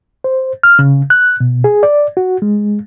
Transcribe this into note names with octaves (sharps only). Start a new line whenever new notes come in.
C5
F6
C#3
F#6
B2
G#4
D5
F#4
G#3